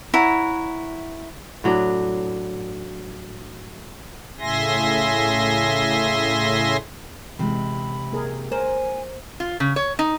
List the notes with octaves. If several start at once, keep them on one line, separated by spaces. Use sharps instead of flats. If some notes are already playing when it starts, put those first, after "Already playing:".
E4 C#5 F#5 A#5
A2 F#3 D4
A2 C#3 E5 G#5 C6 A#6
C3 E3 G#3 B5
A#3 G#4 A#4
A#4 C5 G#5
F4
C#3
C#5
D#4